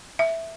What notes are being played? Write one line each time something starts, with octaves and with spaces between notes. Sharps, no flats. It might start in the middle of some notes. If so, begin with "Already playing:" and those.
E5